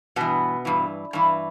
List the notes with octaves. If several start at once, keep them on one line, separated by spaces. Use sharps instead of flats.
G2 B2 E3 B3
G2 E3
G2 E3